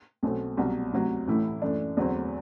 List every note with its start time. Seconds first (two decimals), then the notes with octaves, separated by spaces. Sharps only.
0.23 B1 B2 A3 C4
0.57 C2 B2 F#3
0.92 D2 C3 F#3
1.27 A1 A2 E3 A3 E4
1.62 F#2 E3 A3 D4
1.97 E2 D3 F#3 C4